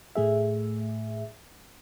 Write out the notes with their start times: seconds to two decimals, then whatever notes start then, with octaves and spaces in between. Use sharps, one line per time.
0.15 A2 A3 G#4 E5